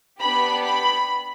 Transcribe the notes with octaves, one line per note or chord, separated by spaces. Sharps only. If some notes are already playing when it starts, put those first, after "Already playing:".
B3 D4 G4 B5
B5